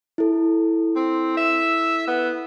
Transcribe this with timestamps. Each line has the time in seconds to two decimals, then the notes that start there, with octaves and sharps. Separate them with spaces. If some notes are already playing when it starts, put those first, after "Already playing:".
0.18 E4 A4
0.96 C4
1.37 E5
2.07 B3